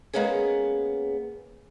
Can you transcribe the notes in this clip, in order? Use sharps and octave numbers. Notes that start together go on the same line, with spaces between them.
G#3 A#3 B3 C#4 G#4